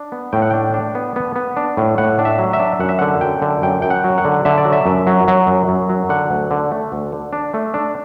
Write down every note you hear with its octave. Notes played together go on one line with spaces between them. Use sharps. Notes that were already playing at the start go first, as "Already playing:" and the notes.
Already playing: D4
B3
A2 G5
F#5
D4 G5
D4
B3
B3
B3
D4
A2
A2 F#5
D4
E5
F#3
E5
D4
F#2 F#5
E5
D3 F#5
F#2 G5
D3
F#2 G5
F#2 G5
F#5
F#3
F#5
D3
D3 E5
D5
F#3
E5
F#2
F#3
F#3
F#2
F#2
F#3
D3 F#5
D2
D3
A3
D2
D3
D4
A3
D4